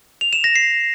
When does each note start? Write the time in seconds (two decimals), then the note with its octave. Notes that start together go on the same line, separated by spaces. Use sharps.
0.21 F7
0.33 E7
0.44 A#6
0.56 C7